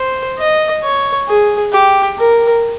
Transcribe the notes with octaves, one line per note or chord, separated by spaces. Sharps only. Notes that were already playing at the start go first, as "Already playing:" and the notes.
Already playing: C5
D#5
C#5
G#4
G4
A#4